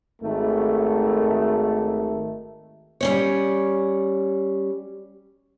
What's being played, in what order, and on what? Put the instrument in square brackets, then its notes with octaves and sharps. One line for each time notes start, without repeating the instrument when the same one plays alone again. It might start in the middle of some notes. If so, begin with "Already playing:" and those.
[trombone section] G#1 D#3 A3
[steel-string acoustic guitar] G3 C#4 C#5